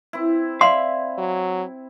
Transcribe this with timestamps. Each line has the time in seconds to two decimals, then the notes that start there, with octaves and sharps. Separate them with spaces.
0.13 C4 E4
0.61 D5 E5 F5 C6
1.18 F#3